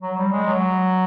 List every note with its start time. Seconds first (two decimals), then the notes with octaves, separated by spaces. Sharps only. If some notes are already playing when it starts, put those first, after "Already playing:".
0.02 F#3
0.18 G3
0.32 G#3
0.47 F#3